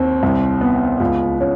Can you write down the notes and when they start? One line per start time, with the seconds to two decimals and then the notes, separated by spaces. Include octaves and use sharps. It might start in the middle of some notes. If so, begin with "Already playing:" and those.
Already playing: D#2 C4
0.23 C2
0.61 B3
1.00 C#2
1.40 C#4